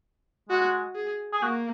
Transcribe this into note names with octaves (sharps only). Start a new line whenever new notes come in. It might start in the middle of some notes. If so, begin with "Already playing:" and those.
G#3 F#4
G#4
G#4
A#3 F#4